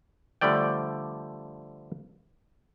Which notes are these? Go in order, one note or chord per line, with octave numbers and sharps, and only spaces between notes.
D3 F3 G3 A3 D5 G5